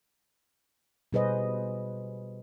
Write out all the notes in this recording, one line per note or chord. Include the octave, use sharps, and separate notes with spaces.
B2 G3 G#4 B4 C5 D#5